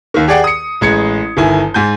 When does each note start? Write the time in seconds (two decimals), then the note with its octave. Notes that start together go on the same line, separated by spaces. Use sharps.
0.14 D#2 D#3
0.28 G4 G#4 D5 F#5 G5
0.44 D#6 C#7
0.81 A1 G#3 G#6 C#7
1.37 G1 D#3 E4 G#5
1.74 G#2 G#5 G6